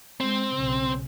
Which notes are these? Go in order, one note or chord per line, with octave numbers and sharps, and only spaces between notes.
G#3 C4
B1 C#3